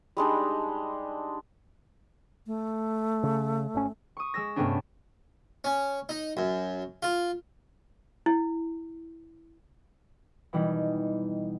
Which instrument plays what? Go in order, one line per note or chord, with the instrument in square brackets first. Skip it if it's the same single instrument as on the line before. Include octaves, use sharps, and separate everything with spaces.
[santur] G3 G#3 D4 D#4
[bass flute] A3
[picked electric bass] C#3
G#1 C#4
[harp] C#6 D#6
G#3 E6 A#6
G2 C3 A3 B3 C#4 D4
[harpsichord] C#4
D#4
F#2
F4
[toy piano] E4
[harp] B2 E3 G3 D#4